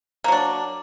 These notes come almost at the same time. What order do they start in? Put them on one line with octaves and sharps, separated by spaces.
A#3 F#3 D4